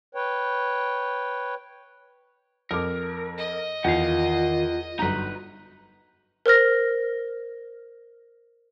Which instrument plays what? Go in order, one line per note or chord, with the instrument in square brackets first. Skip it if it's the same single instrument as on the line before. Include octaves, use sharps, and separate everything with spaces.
[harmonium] B4 C#5 G5
[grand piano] F2 D6 [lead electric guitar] A#4
[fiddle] D#5
[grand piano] E2 [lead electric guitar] D#3 F5 [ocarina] F4
[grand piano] G1 F#3 A#5 [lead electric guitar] D#4 B4
[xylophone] A#4 C5 F6 A#6